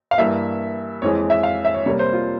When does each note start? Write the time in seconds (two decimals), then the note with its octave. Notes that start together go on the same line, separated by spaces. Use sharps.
0.11 F5
0.18 G2 E3 G3 A#3 E5
1.02 F2 E3 G#3 C#5
1.30 E5
1.43 F5
1.65 E5
1.74 C#5
1.86 C3 G3 A#3 C#5
1.99 C5
2.13 F4